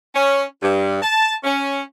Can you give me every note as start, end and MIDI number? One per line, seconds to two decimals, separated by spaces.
0.15 0.43 61
0.61 0.99 43
1.02 1.33 81
1.43 1.80 61